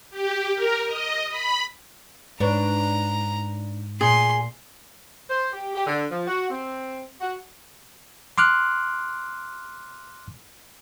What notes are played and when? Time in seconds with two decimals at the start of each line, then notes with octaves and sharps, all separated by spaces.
0.10 G4
0.55 A#4
0.85 D#5
1.29 B5
2.40 G#2 D4 B4 C#5 A#5
4.01 A#2 G#4 C6
5.30 C5
5.53 G4
5.75 G4
5.87 D3
6.12 F3
6.28 F#4
6.50 C4
7.21 F#4
8.38 C6 D6 F6 F#6